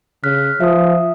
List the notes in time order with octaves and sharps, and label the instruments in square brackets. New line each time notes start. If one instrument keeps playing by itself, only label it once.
[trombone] C#3 [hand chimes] F6 F#6 B6
[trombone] F3 [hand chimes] E5 D#6